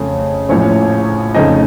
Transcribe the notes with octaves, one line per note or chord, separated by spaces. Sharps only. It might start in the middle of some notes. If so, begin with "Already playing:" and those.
Already playing: F2 C#3 A3 C#4
A#1 A2 F3 C#4 C#5
F2 C#3 A3 D#4 D#5